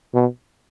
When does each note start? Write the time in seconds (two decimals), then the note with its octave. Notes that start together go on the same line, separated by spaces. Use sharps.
0.14 B2